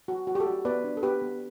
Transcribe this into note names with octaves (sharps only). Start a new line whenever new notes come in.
F#4
F#4
G4
A4
F#4
B3 B4 D5
D4
A4
B3 G4 B4
B3